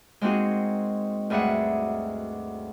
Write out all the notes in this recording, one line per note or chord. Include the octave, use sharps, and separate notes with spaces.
G#3 A#3 C4 D#4 F#4 G#4
D2 G2 G#4 E5 F#5